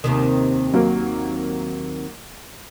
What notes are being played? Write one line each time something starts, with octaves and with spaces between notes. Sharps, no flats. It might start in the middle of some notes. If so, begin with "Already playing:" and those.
D#2 C3 D#3
F#3 A#3